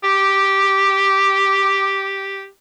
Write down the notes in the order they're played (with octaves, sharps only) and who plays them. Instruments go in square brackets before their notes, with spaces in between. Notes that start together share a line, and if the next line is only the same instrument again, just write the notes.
[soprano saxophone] G4 [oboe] D6